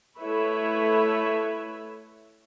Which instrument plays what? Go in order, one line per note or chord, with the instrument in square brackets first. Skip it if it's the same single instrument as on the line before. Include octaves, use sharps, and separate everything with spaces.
[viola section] A3 E4 B4 C#5 E5 B5